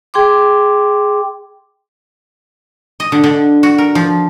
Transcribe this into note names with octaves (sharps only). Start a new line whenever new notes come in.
G#4 G5 C6 D6
D#5
D3
D3
F#4
A#4
F3